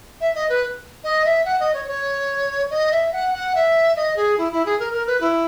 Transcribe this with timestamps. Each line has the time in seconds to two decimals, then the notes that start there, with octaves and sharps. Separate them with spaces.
0.21 E5
0.35 D#5
0.49 B4
1.04 D#5
1.25 E5
1.45 F#5
1.60 D#5
1.74 C#5
1.88 C#5
2.70 D#5
2.92 E5
3.13 F#5
3.34 F#5
3.55 E5
3.96 D#5
4.16 G#4
4.38 E4
4.52 E4
4.66 G#4
4.80 A#4
4.93 A#4
5.07 B4
5.21 E4